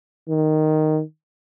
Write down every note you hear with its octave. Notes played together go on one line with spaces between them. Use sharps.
D#3